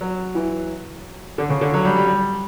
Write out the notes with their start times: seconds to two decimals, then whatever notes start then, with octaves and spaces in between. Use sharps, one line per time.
0.01 F#3
0.35 E3
1.38 D3
1.50 C#3
1.61 D3
1.74 F#3
1.85 G3
1.97 G3
2.07 G3